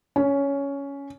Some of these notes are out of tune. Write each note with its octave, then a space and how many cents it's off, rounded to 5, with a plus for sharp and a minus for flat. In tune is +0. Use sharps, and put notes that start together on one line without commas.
C#4 +10